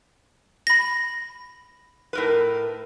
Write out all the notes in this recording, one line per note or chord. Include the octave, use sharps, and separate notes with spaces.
B5 A#6
A2 A#4 B4